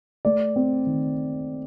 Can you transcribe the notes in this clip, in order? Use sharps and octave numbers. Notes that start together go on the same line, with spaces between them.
A3 D5
C4
D#3